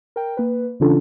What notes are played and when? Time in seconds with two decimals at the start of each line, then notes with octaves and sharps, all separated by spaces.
0.16 A#4 G5
0.37 A#3 B4
0.80 C#3 E3 C#4 D4 F4 A4